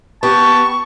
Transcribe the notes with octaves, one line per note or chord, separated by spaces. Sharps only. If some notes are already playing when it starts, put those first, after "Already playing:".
B3 G4 A5 C#6